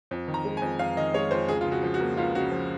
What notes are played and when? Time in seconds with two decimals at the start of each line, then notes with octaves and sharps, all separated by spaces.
0.11 F2
0.28 D#3
0.34 A#5
0.45 G#3
0.57 G#5
0.62 F2
0.79 F2 F5
0.97 D#3 D#5
1.14 G#3 C#5
1.31 F2 C5
1.48 C#2 G#4
1.61 C#3 F4
1.72 F#4
1.83 F3
1.94 F#4
2.00 A#3
2.17 C#2 F4
2.35 C#3 F#4
2.52 F3